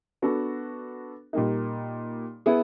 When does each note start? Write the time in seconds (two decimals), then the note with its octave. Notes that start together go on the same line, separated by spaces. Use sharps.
0.22 B3 D4 F#4 A4
1.33 A#2 G3 A#3 D#4
2.46 B3 E4 G#4